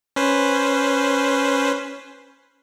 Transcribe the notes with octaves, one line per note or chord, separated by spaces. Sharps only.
C#4 B4 C5